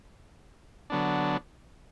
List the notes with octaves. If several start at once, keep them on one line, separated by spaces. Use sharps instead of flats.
D3 F#3 B3 D4